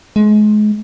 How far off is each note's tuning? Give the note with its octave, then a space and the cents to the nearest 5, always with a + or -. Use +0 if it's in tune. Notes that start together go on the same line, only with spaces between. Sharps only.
G#3 +30